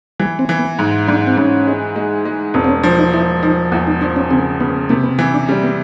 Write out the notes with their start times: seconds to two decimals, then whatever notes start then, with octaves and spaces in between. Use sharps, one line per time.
0.19 E3 G3
0.39 C4
0.49 E3
0.59 B3
0.79 G#2
1.08 G#2 D4
1.27 C4
1.37 G#2 C#4
1.67 G#3
1.96 G#3
2.25 G#3
2.54 E1 C4
2.64 C4
2.69 C#4
2.83 F3 D4
2.99 D#4
3.13 F3 E4
3.43 F3 D#4
3.72 E2 E4
3.87 D#4
4.01 F3 D4
4.16 C#4
4.30 C#3 C4
4.60 C#3 B3
4.89 C3 A#3
5.04 B3
5.19 E3 B3
5.34 D4
5.48 G3 C#4
5.64 B3